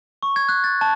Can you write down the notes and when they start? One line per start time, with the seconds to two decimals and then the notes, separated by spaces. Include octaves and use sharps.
0.23 C#6
0.36 G#6
0.49 F#6
0.64 A6
0.81 A5